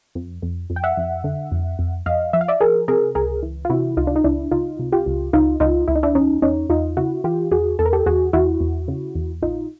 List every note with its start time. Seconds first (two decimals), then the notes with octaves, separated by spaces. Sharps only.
0.15 F2
0.42 F2
0.70 F2
0.76 G5
0.84 E5 F#5
0.97 F2
1.24 D3
1.52 F2
1.79 F2
2.06 F2 D#5 F5
2.33 F3 E5
2.41 F5
2.48 D5 E5
2.60 F3 G#4 A#4
2.88 C3 G#4 A#4
3.15 C#2 G#4 A#4
3.42 E3
3.65 F4
3.70 C3 E4 F#4
3.97 C#2 D#4 F4
4.07 D4
4.16 D#4
4.24 C#2 D4 E4
4.51 C#2 D#4 F4
4.79 C3
4.92 F4 G4
5.06 C#2
5.33 C#2 D#4 F4
5.60 C#2 D#4 F4
5.88 C#2 E4
5.95 D#4
6.03 D4 E4
6.15 E2 C#4 D#4
6.42 E2 C#4 D#4
6.69 E2 D#4 F4
6.97 C#3 E4 F#4
7.24 E3 F4 G4
7.51 E2 F#4 G#4
7.79 E2 A4
7.86 A#4
7.93 G4 A4
8.06 E2 F#4 G#4
8.33 E2 E4 F#4
8.60 E2
8.88 C#3
9.15 E2
9.42 A#1 D#4 F4